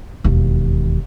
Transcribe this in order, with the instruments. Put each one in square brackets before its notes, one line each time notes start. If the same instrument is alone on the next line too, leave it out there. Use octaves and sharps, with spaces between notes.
[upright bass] E1 D#2